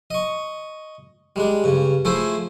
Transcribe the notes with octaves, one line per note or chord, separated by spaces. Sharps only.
D#5 C#6
G3 G#3 D4
G2 C#3
F3 A3 E4 G#4 C5